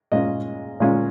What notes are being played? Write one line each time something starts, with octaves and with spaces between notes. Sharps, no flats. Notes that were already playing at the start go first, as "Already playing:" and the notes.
A#2 G#3 C#4 F4 D#5
A#2 G#3 C#4 F4